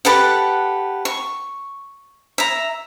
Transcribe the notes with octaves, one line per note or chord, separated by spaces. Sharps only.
G4 A4 B4 F#5
C#6
E5 A#5